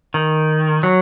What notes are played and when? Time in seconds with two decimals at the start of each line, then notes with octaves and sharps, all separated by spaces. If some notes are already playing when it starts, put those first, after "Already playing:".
0.14 D#3
0.83 F#3